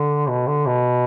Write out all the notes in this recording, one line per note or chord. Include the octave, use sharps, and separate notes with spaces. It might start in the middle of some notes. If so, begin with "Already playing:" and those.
Already playing: D3
B2
D3
B2